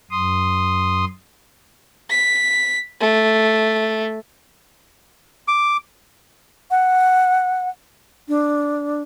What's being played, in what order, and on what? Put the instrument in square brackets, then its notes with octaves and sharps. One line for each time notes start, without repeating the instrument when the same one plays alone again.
[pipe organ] F#2 C6 D#6
[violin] B6
A3
[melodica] D6
[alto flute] F#5
D4